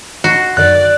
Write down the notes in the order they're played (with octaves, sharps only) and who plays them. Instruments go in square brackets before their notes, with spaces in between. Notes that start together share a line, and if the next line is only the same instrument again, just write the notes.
[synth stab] D#4 C6 [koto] F#4
[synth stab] F#2 D3 D#3 [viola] D5 [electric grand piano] F#6